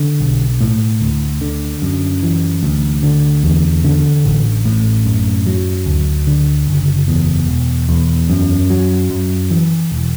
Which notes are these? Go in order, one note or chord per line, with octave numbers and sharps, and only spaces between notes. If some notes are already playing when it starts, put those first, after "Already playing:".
Already playing: D3
B1
A2
D2
D3
F#2
E3
D2
D3
E2
D3
A1
A2
F#2
F#3
D2
D3
F#1
E2
E1
E2
F#2
F#3
F#2
E3
E1